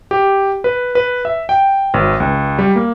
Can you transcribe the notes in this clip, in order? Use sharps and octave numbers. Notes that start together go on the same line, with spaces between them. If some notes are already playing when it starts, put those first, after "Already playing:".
G4
B4
B4
E5
G5
G#1
C#2
G3
A#3